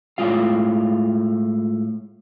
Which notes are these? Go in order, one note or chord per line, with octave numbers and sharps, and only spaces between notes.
A2 G#3 F4 F5